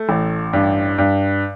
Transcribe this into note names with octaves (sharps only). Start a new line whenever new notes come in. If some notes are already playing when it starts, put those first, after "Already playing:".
Already playing: A3
A1
G2
G2